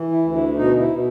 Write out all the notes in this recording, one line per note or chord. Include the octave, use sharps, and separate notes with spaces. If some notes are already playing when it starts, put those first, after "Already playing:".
Already playing: E3
E4
D2
E4
B2 D#4
E4
B2